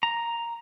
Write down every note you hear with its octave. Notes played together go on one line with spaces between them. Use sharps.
A#5